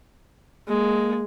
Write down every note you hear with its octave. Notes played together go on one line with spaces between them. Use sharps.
G#3 A#3